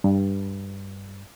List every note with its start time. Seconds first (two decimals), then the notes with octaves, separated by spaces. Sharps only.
0.04 G2